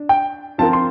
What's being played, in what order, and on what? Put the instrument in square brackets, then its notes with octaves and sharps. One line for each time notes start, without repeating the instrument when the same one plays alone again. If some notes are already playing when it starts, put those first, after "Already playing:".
Already playing: [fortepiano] D4
[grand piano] G5
[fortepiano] F3 C4 F4 A#4 [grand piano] A5
[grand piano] C6